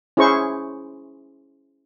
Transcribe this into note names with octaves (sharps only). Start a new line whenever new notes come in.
C#4 E4 G#4 C5 C#6